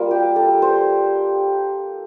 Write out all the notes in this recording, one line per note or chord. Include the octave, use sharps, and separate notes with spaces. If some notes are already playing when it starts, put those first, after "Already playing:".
Already playing: G3 A#3 F4
G4
A4
C5